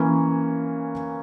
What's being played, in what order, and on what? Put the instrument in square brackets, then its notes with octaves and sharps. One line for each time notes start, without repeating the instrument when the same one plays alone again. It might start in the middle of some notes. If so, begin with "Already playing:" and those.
Already playing: [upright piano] E3 A#3 C#4